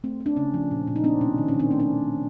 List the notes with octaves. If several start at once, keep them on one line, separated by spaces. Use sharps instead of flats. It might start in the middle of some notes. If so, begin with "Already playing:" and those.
A3 C4
C4
D4
C#3 C#4
F3
A#2
A#2
D#4
B3 C4 D4
B2 C#4
D#3
C#4
D#3
C4 D4
A3 C#4
C4 D4